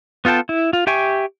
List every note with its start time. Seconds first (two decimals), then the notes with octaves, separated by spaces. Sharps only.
0.25 B3 F4 A4 G5 A5
0.49 E4
0.73 F4
0.87 G4 E5 G5 G#5 C#6